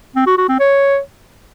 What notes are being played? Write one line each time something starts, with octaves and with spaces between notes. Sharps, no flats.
C4
F#4
F#4
C4
C#5